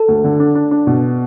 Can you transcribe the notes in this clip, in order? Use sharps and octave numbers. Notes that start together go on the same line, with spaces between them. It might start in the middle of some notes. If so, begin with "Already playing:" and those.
Already playing: A4
D2
D3
D4
D4
D4
B2